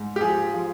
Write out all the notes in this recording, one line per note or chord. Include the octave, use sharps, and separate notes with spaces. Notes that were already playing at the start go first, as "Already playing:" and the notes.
Already playing: G#2
G4
F3 G#4
F3